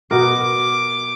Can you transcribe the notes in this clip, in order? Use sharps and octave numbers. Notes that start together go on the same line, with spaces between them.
B2 A#4 D6